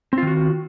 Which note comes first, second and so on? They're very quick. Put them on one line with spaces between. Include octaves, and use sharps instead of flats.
C4 F4 D#3 F#4